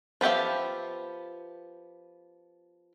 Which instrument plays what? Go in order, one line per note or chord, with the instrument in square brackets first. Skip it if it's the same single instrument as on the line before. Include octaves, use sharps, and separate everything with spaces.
[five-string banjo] F3 B3 G4 E5 F5